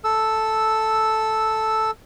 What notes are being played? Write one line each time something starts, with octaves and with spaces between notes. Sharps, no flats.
A4 E6